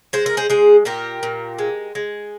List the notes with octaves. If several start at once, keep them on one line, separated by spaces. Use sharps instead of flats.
G#3 C5
A#4
G#4 C5
G#3 G#4 C5
A#2 G4 A#4
A#2
G#3
G#3